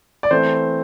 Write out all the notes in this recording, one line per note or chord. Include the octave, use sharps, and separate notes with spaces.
D5
E3 A3 C4 C5